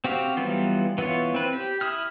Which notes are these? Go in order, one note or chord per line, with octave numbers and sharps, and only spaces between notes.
C4 F#4 G4 F5
E3 F#3 G3 B3 F4
E3 B3 E4 F4 C#5
C4 B4
G4
E4 D#6 F6